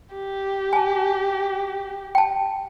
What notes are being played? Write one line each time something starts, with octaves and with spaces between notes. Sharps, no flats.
G4
G#5 A5
G5 A5